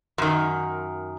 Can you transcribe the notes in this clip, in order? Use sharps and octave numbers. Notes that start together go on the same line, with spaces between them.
F#2 D#3